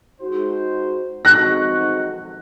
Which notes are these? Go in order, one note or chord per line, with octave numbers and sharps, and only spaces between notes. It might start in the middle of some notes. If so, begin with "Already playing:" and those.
G#3 D#4 F#4 C5
G#3 C4 D#4 F#4 F#6 A#6